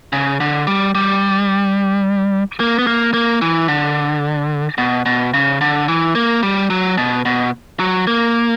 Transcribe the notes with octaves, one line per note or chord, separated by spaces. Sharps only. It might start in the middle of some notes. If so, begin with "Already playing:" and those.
C#3
D3
G3
G3
A#3
B3
A#3
A#3
E3
D3
B2
B2
C#3
D3
E3
A#3
G3
F#3
B2
B2
F#3
A#3